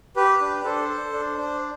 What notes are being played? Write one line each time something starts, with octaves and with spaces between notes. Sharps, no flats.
G4 B4
D4
D4 A4 C5
A4
D4
D4